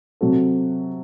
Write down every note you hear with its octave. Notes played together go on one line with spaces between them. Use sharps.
C3 F#3 C4 F#4 A4